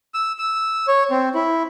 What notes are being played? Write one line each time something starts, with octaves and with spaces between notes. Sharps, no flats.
E6
E6
C#5
C4
E4